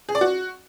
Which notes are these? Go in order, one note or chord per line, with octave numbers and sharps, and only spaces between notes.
G#4
D5
F#4